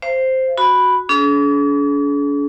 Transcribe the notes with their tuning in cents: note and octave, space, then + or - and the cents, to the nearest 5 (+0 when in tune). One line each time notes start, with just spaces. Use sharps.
C5 +0 F5 -45
F#4 -5 B5 +0
D4 -45 G#4 +45